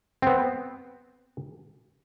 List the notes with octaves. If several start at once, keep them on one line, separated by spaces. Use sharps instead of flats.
B3 C4